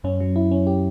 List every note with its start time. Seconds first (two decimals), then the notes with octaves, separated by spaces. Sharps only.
0.04 F#2 C#4
0.20 F#3
0.36 E4
0.51 C#4
0.67 G4